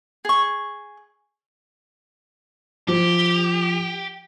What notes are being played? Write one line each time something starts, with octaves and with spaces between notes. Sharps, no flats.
G#4 C#6
F3 G4